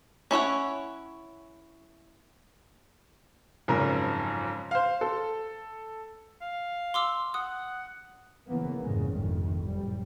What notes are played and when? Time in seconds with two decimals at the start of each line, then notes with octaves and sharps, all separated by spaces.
0.31 C#4 E4 C#5 F#5
3.68 F#1 F2 G#2 C#3 A#4
4.71 C5 F5
5.01 A4
6.41 F5
6.94 C6 D6 E6
7.34 F#5 D#6
8.47 C#3 E3 F3 A#3 B3
8.82 F1 E2 G#2 C#3 G#3
9.14 G1 C2 F2 G#2 D#3
9.65 F#1 A2 G3